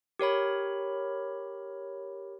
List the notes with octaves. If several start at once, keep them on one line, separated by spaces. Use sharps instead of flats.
G4 A#4 C#5 B5